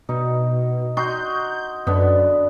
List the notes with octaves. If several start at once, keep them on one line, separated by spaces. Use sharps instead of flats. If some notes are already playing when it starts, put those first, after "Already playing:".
B2 D#4
D#4 F#4 C6 G6
F#2 D3 B3